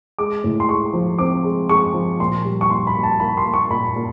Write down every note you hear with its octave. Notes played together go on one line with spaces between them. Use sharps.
G#3 D6
A2
C6
G#3 C#6
F3
C4 D6
G#3
G#3 C#6
F3
A#2 C6
G3
C#6
A#2 C6
B5
A#2
A5
A#3 B5
C6
A#3
C#6
A#2 B5
A#2